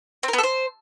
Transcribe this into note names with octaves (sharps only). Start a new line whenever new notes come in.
C4
A#4
B3
A4
C5